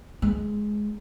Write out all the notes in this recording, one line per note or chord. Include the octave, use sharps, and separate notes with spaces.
G#3